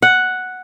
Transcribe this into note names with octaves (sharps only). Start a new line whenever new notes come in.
F#5